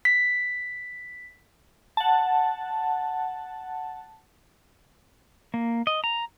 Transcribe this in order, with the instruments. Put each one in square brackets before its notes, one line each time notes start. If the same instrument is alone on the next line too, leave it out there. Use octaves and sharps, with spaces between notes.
[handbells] B6
[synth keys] F#5 A5
[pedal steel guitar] A#3
D#5
A#5